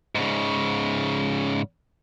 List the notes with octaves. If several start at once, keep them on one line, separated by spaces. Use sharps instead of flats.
G#2 C#3